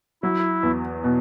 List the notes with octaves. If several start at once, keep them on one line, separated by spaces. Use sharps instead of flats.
F#3 E4
E2
B2